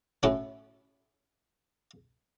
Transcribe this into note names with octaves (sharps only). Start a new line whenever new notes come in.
A2 A3 C#4 E4 F#4 A4